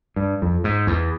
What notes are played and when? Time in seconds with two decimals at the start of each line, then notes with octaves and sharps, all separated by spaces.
0.16 G2
0.42 F2
0.64 G#2
0.87 E2